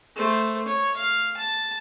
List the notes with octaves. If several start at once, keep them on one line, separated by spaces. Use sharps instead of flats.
A3 C5
C#5
F5
A5